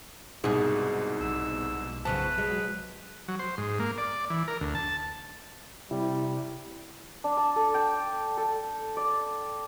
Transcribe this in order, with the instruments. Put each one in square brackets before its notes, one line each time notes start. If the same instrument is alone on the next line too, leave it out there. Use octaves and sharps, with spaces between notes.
[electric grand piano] C2 G#2 [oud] B2 G#4
[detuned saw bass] B1 [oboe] E6
[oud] F#2 C#3 F3 [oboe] B4 [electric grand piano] A5
[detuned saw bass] F#3 [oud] G#3
[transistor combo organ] F#3
C5
G#2
A#3
D5
E3
A#4
D2
A5
[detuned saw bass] C3 [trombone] G3 [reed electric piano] E4
[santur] D4
A5
A4
G5
A4
D5